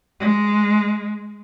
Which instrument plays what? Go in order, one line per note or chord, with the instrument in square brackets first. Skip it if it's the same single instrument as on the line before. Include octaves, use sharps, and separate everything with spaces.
[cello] G#3